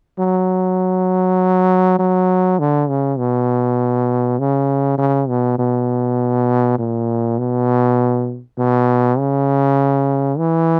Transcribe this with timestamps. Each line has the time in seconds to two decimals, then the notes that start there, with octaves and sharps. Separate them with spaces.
0.19 F#3
1.99 F#3
2.59 D3
2.89 C#3
3.18 B2
4.39 C#3
4.98 C#3
5.29 B2
5.59 B2
6.78 A#2
7.38 B2
8.58 B2
9.18 C#3
10.38 E3